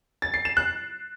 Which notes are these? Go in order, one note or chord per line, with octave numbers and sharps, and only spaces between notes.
A6
C7
E7
F#6